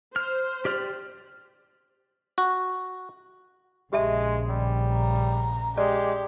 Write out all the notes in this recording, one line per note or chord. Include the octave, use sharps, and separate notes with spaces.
C5 F6
G4 D5 F6
F#4
A#1 C#3 G#3 G4 E5 A5
G3
A#5
G#3 G4 D5